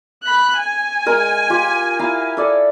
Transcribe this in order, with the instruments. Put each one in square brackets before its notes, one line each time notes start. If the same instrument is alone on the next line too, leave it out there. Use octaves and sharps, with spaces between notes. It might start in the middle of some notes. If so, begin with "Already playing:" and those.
[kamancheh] B5 F#6
G#5
[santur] G#3 A#4
F4 G4
E4 F5 A#5
A4 D5 E5